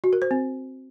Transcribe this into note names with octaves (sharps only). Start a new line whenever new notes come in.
F#4
A#4
C5
C4